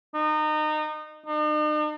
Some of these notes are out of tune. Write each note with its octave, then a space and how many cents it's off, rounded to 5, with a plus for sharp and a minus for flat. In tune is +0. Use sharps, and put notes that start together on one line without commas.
D#4 -25
D#4 -45